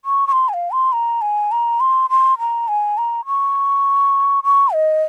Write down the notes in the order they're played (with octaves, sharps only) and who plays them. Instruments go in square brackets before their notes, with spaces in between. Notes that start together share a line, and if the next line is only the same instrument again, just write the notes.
[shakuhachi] C#6
C#6
C6
G#5
F5
C6
A#5
G#5
A#5
C6
C6
A#5
G#5
A#5
C#6
C#6
D#5